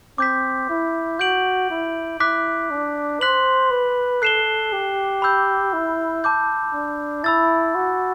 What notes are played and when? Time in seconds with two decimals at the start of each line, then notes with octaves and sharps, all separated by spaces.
0.18 C4 D6 G6 B6
0.69 E4
1.19 F#4 G6 D7 F#7
1.70 E4
2.20 E4 D6 F#6 B6
2.71 D4
3.21 C5 F#6 B6 F#7
3.71 B4
4.22 A4 F#6 C7 E7 G7
4.73 G4
5.22 B5 E6 G6
5.73 E4
6.24 A5 D6 G6
6.73 D4
7.24 E4 B5 E6 A6
7.75 F#4